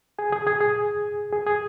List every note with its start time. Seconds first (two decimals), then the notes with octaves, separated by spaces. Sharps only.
0.19 G#4 G#5
0.32 G#4 G#5
0.47 G#4 G#5
0.61 G#4
1.32 G#4
1.47 G#4